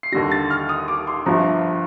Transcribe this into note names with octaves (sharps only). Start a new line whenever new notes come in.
C7
D#2 D3 G3 A#6
A6
F6
D#6
D6
C6
G1 G2 F3 A#5